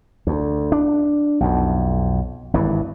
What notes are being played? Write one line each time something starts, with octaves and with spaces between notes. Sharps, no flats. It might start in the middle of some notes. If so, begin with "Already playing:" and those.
D2
D4
B1 F2
G#1 G2 E3